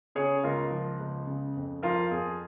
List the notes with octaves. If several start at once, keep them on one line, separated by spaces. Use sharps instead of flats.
C#3 G#4 C#5
C#2 F4 A#4
F3
C#2
C#3
F2
F3 F4 A#4
F2 G#4